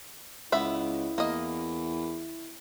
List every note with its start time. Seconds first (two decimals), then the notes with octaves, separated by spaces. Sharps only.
0.52 C#2 B3 E4 E5 B5
1.18 E2 A#3 D#5